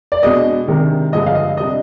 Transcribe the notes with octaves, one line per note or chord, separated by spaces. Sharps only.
D5
B2 G#3 D4 D#5
C3 D#3 G#3 D4
G2 D3 F3 G#3 D#5
F5
D#5
C3 G3 D4 D#5